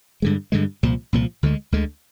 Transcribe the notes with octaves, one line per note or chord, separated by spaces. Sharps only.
G2 D3 G#3
G2 D3 G#3
C2 A#2 F3
C2 A#2 F3
D2 D3 G#3
D2 D3 G#3